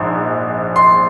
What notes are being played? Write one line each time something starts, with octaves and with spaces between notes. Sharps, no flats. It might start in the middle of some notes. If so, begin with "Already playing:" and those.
Already playing: A#1 G#2
C6